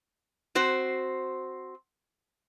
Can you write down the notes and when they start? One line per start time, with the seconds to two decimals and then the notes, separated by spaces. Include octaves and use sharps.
0.55 C4 F#4 C5